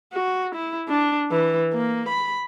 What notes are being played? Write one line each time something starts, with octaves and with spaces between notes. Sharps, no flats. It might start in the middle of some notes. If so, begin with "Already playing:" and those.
F#4
E4
D4
E3
A#3
B5